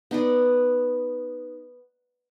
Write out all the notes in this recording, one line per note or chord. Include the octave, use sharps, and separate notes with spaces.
B3 D#4 B4 D5